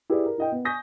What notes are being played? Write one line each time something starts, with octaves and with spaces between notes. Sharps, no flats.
E4 G4 G#4 B4 D5
A#4
E4 D#5 G5
B3
G#5 C#6 D#6 G6 A#6 B6